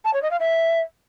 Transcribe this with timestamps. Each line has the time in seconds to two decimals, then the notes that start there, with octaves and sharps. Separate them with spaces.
0.05 A5
0.13 C#5
0.22 D#5
0.31 F5
0.40 E5